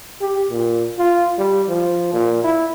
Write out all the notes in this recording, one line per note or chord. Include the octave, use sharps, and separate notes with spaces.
G4
A#2
F4
G3
F3
A#2
E4